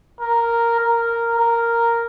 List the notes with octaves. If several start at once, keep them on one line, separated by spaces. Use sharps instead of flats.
A#4
A#4
A#4